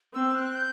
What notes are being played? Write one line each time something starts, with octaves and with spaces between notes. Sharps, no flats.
C4 E6
F#6
G6